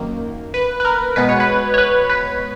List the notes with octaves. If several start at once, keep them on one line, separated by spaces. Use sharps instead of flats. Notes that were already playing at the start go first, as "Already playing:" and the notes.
Already playing: F#2 D#3 A#3
B4
B4
A#4
B2 G#3 B3 B4
C#5
B4
C#5
B4
B4